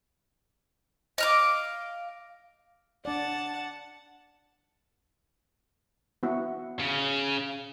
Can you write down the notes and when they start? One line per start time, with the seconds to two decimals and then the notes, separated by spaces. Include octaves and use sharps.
1.18 D#5 F5 D6
3.05 D4 D5 F#5 A5
6.23 B3 E4 F#4
6.80 C#3